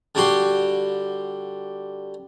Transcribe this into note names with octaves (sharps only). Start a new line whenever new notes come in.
D3 G3 F#4 G4 C6